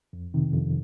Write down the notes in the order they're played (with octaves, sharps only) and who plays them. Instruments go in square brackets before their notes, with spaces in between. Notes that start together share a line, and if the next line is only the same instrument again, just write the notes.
[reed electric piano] F2
C3 D#3
F2